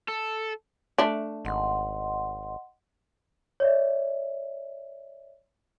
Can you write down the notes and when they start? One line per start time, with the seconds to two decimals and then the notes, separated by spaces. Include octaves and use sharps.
0.08 A4
0.98 A3 D4
1.45 G#1 D#5 F#5 C6
3.60 C#5 D5 E5